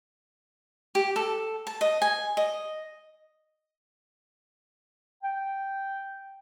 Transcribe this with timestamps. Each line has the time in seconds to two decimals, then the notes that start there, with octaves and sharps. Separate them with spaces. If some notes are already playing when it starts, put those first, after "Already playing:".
0.95 G4
1.16 A4
1.67 A5
1.81 D#5
2.02 G#5
2.37 D#5
5.23 G5